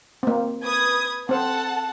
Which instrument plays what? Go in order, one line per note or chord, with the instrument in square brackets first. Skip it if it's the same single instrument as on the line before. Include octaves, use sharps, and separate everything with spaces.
[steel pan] A#3 C4
[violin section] B4 D#6 G#6
[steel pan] C4 C5 [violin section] A4 F#5 A5